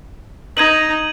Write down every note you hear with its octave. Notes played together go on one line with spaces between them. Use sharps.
D#4 G#6 D#7 F#7